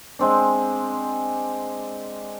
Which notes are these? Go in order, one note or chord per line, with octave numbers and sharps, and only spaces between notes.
G#3 C4 D4